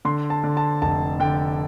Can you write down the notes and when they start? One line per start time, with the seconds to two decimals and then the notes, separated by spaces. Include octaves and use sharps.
0.05 D3 C6
0.30 A5
0.44 D3
0.57 A5
0.82 F1 A5
1.20 D3 G5